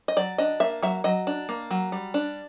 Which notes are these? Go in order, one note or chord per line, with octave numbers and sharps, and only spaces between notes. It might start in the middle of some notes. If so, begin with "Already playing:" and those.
D#5
F#3 D5
D4 D#5
A#3 E5
F#3 E5
F#3 D#5
D4
A#3
F#3
G3
D4